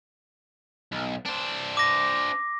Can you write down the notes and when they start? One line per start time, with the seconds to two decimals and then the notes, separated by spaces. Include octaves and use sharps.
0.92 B1
1.25 D4 C5
1.77 D6 A#6